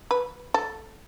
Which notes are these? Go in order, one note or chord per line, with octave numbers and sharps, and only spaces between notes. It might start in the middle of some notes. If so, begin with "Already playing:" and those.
B4
A4